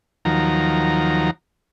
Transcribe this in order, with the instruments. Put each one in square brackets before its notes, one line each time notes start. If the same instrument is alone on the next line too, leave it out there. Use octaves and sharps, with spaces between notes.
[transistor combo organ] D#2 D#3 F3 F#3 A#5